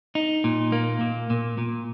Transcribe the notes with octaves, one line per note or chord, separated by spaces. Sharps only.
D#4
A#2
A#3
A#2
A#2
A#2